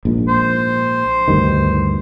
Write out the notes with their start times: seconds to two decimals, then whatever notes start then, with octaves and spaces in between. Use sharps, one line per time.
0.05 A#1 G#2
0.28 C5
1.28 D2 G2 D#3